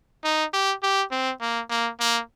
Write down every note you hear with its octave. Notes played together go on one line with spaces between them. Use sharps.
D#4
G4
G4
C4
A#3
A#3
A#3